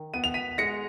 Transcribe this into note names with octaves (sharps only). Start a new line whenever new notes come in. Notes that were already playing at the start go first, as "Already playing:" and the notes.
Already playing: D#3
B3 D#7
F7
B6 D#7
G#3 A#6 C#7